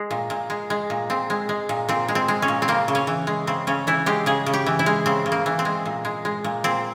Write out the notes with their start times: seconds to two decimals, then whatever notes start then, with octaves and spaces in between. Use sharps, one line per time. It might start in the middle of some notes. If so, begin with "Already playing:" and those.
Already playing: G#3
0.11 A#2
0.30 A#2
0.50 G#3
0.70 G#3
0.90 A#2
1.10 A#2 C4
1.30 G#3
1.49 G#3
1.69 A#2
1.89 A#2 C4
2.08 G#3
2.15 C4
2.28 G#3
2.42 C#4
2.48 A#2
2.62 C4
2.68 C#3 A#3
2.88 C#3
2.95 C#4
3.07 E3
3.27 G#3
3.47 C#3 C4
3.67 C#3 C#4
3.87 E3 E4
4.06 G#3 G4
4.26 C#3 G#4
4.46 C#3
4.53 G4
4.66 E3
4.79 E4
4.86 G#3
5.06 C#3 C4
5.26 C#3
5.32 A#3
5.46 E3
5.59 C4
5.65 G#3
5.86 A#2
6.05 G#3
6.25 G#3
6.44 A#2
6.64 A#2 C4